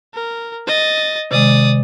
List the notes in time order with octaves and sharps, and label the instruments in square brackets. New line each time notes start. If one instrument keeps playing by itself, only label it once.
[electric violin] A#4
D#5 A6
[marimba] C3 D#3 G#3 [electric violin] D5 D#6